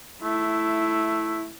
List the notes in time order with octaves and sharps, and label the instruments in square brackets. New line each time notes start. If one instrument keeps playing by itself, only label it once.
[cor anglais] A3 [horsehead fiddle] E4